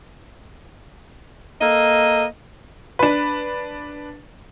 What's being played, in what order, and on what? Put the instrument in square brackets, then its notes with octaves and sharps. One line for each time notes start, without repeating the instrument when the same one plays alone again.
[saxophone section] A#3 A4 D#5
[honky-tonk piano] D4 B4